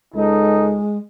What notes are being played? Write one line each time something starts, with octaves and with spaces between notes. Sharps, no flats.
C#2 G#3 D#4 A4